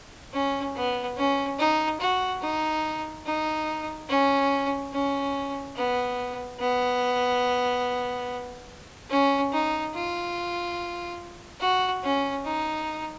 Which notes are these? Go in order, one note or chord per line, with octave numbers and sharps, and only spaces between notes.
C#4
B3
C#4
D#4
F#4
D#4
D#4
C#4
C#4
B3
B3
C#4
D#4
F4
F#4
C#4
D#4